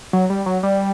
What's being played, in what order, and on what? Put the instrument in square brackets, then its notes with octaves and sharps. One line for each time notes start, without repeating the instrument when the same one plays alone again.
[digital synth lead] F#3
G3
F#3
G3